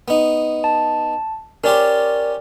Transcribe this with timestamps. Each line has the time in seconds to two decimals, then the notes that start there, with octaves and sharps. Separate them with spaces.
0.08 B3 D#4
0.64 A5
1.64 C#4 G4 A#4 C5 D5